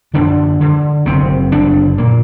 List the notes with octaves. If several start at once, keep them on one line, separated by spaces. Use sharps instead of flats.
F#2 D3 D4
D3
F#1 C3 C4
F#1 D3 D4
A#2 A#3